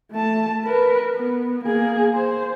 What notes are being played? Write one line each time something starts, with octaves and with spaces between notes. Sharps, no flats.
A3 A5
A#4 B4
B3
A#3 G#4
C5